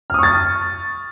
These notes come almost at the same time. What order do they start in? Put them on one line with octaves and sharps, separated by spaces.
F6 D#6 C#6 A6